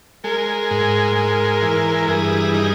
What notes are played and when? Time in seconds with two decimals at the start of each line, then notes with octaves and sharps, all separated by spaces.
0.24 G#3 A#4
0.71 G#2
1.16 G#3
1.62 E3
2.08 G2 G#4
2.54 D#4